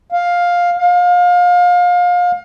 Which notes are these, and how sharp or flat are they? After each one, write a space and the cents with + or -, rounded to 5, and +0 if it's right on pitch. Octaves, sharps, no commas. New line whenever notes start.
F5 +10
F5 +30